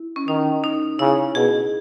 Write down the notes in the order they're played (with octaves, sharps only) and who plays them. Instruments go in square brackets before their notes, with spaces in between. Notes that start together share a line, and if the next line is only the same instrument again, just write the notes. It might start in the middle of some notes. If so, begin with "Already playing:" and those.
Already playing: [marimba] E4
C#4
[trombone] D#3 [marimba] D#4
[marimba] D#4
[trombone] C#3 [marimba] E4
[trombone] B2 [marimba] G#4